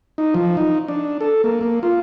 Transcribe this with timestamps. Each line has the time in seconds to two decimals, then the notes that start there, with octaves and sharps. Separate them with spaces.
0.18 D#4
0.34 F3
0.57 D#4
0.88 D4
1.21 A4
1.44 A#3
1.61 A#3
1.83 F4